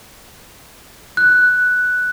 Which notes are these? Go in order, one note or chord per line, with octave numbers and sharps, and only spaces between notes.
F#6